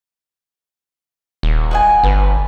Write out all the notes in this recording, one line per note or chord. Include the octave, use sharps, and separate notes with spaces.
D#1
F#4 D#5 G#5
G1 B4